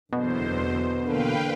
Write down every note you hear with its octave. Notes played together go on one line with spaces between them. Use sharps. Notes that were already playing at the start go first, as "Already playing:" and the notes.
F#1 E2 B2 D3 C5
D3 A#3 B4 F5 G5